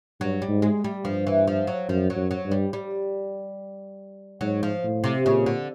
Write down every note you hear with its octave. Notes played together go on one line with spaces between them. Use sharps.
G2 F#3
G3
G#2
G#3
G3
G2 F3
E3
F3
F#3
F#2 F3
F#3
F#2
F#3
G2
G3
G3
G#2 F#3
F3
A2
C3
A#2 C#3
D3